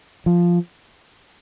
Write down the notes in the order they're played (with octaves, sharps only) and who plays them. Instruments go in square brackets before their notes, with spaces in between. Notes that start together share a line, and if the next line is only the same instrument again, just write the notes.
[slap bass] F3